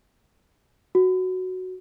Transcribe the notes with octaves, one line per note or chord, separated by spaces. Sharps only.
F#4